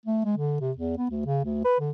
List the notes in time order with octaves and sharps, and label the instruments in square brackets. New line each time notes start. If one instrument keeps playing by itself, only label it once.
[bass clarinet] A3
G#3
D3
C3
E2
B3
D2
C#3
D2
B4
D3